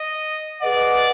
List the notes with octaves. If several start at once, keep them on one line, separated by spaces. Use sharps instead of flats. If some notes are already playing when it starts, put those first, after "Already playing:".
Already playing: D#5
G#4 B4 D5 D#5 F#5